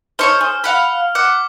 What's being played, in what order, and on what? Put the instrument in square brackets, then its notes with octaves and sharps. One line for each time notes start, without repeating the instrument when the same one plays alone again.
[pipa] D#4 A4 C#5 [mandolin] C5 C#6 [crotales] F6
[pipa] G#4
[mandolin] F5 F#5 B5 [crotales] F6
[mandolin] F#5 [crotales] D6